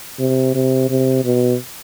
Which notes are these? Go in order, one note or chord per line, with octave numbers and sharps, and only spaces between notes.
C3
C3
C3
B2